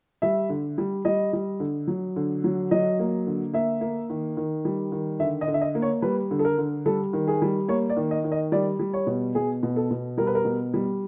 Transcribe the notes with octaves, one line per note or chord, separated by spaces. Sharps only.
G3 E5
D3
G3
G3 D#5
G3
D3
F#3
D3
F#3
F#3 D#5
A#3
D3
A#3 E5
A#3
D#3
D#3
G3
D#3
D3 E5
D#5
D3
E5
D#5
A#3
C#5
G3 B4
D3
A4
A#4
D3
G3 A4
D#3
G#4
G3
A#3 C#5
D5
D#3
D#5
D#3
D#5
G3 D5
G3
C#5
B2
B2 G#4
B2
A4
B2
G3 A#4
B4
A#4
B2
G3